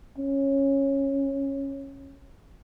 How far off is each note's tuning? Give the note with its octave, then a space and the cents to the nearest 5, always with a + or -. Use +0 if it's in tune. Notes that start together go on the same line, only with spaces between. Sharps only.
C#4 -15